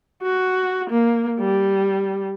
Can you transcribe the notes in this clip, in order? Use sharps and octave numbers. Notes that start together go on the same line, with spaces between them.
F#4
A#3
G3